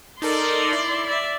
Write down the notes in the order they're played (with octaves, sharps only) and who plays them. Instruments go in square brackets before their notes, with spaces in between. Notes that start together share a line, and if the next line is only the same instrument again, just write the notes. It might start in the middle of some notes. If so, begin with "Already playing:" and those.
[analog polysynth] D#4 A4 A#4 [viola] D5 C6
[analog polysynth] E4
[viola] D5 E5